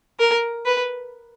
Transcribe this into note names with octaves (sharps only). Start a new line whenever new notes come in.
A#4
B4